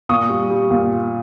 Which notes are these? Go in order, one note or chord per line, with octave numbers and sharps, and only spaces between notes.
A#2 C#6 D#6
G3
G3
A#2